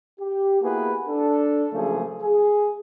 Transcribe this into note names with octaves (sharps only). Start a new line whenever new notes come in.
G4
A#3 B3 E4 F#4 G#4 B4
D4 A4
C#3 F3 F#3 A3 A#3 G#4
G#4